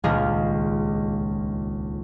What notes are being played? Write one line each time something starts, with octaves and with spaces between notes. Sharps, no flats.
D#1 C#2 D4 G#4 D#5 F5